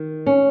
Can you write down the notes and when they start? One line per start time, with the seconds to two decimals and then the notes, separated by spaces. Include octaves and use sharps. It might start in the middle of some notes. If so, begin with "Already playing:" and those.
Already playing: D#3
0.26 C#4